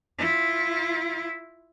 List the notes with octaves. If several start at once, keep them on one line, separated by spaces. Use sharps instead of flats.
E4 F4